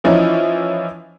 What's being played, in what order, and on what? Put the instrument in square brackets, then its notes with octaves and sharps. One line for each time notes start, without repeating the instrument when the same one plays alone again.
[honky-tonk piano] E3 F3 C#4 D#4 E4